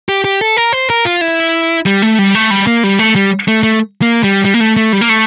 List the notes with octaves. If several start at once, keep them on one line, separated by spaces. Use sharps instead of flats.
G4
G4
A4
A#4
C5
A#4
F4
E4
G3
A3
G3
A3
G3
A#3
G3
A3
G3
A3
A3
A#3
G3
G3
A#3
A3
A3
G3
A#3
A3